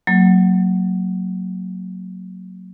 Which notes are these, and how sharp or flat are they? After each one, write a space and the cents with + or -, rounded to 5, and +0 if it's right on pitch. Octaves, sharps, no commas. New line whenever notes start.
F#3 +0 A#3 -20